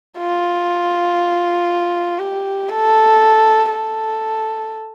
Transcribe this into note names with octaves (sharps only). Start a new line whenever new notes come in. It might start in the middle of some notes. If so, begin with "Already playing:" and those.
F4
G4
A4
A4